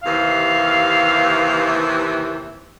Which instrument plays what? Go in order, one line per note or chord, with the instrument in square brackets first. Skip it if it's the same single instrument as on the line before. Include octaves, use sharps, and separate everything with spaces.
[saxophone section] D#2 C3 E3 [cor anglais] F5